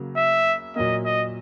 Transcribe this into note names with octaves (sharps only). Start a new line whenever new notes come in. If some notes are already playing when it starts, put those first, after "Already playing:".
Already playing: C#3 F#3 A#3
E5
A#2 F#3 A#3 D#5
D#5